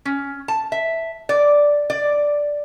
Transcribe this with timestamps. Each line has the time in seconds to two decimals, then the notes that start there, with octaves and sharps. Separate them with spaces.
0.05 C#4
0.48 A5
0.72 E5
1.29 D5
1.90 D5